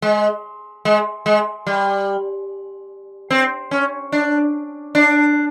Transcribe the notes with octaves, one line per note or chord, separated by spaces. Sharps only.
G#3
G#3
G#3
G3
C4
C#4
D4
D4